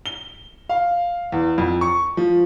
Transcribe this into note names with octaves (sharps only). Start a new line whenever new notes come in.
G7
F5
E2
F2
C#6
F3